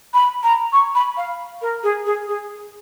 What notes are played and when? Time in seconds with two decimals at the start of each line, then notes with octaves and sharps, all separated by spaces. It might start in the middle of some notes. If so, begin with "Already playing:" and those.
0.14 B5
0.43 A#5
0.73 C#6
0.95 B5
1.17 F5
1.62 A#4
1.83 G#4
2.06 G#4
2.28 G#4